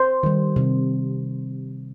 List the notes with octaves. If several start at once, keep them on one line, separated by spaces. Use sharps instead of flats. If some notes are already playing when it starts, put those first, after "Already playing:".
Already playing: C5
D#3 G3
C3